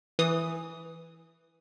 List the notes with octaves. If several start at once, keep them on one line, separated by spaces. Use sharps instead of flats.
E3 D#6